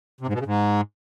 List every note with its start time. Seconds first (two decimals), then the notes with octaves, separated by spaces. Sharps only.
0.21 C3
0.27 G#2
0.33 B2
0.40 C#3
0.46 G#2